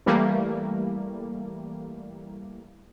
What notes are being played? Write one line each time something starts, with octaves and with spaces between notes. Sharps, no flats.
E3 G3 A3 A#3